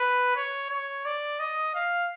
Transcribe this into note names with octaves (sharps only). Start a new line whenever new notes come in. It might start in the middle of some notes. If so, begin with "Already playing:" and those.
Already playing: B4
C#5
C#5
D5
D#5
F5